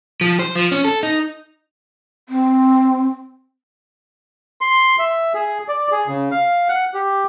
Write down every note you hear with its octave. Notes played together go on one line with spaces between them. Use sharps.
F3
C5
F3
C#4
A4
D#4
C4
C6
E5
G#4
D5
G#4
C#3
F5
F#5
G4